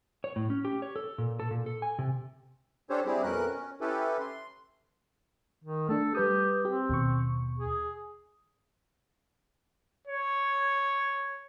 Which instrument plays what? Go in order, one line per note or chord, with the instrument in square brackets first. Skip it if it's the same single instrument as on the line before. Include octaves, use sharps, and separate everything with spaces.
[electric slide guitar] C#5
A2
C#4
G4
C#5
A4
A#2
A4
A#2
A4
G#5
C3
[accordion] C#4 D4 G4 A4 C5 C#5
G3 C4 E4 G4 G#4
F2 B2 C#4 A#4 F#6
C#4
C#4 E4 G4 A4 B4
C6
[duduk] D#3
[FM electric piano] A3 D4 [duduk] A4
[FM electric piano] G3 B4 D#6 [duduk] G4
[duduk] C4 [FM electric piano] G4
[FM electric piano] D#2 B2 C#6
[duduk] G#4
[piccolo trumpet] C#5